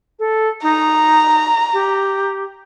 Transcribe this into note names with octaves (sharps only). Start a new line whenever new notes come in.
A4
D#4 A#5
G4